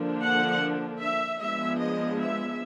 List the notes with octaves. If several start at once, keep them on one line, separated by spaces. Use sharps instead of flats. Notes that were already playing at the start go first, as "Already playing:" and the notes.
Already playing: D3 F3 A#3 D4
F#5
E5
F3 G#3 B3 D4 E5
D#5
E5